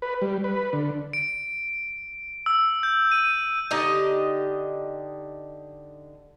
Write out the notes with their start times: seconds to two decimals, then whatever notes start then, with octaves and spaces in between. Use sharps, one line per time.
0.02 B4
0.22 G3
0.44 B4
0.73 D3
1.13 D7
2.46 E6
2.83 G6
3.12 D#7
3.71 D3 D#4 G4 D#5